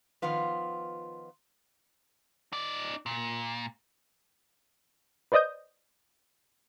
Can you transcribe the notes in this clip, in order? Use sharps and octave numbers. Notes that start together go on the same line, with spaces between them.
D#3 F3 B3 F4 B4
D#4 D5
A#2
B4 C5 D5 D#5 D#6 G6